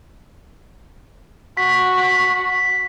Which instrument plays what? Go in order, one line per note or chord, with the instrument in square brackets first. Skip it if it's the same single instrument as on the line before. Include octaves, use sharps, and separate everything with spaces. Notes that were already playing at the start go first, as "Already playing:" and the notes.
[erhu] F#4 [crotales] B6